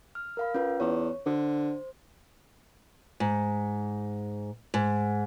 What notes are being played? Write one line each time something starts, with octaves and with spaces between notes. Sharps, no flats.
F6
A#4 F5 B5
C#4 F4 B4
E2 C#5
D3 C5
G#2
G#2